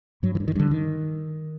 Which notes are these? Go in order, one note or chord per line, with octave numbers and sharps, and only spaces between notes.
G2 F#3
E3
G2
D#3
G2 D3
D#3